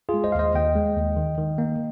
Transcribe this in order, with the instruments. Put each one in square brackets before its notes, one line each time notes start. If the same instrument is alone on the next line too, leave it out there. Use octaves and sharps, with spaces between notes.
[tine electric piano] F4 G#4
G#3
C5 D#5
F5
D#2 C5 D#5
D#2 D#5 G5
G#3
D#2
D#3
D#3
A#3